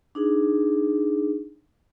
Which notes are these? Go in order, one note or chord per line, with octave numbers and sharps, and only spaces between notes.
D4 D#4 G#4